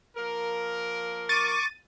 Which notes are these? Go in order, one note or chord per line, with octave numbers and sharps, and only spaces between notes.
F3 A#3 A#4
C#6 D6 A6 D#7